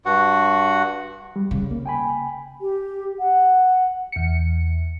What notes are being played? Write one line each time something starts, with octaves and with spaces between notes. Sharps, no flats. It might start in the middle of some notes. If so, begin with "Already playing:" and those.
G2 F#4 F#5
G3
C#3
A#3
G5 G#5 B5
G4
F#5
E2 C#7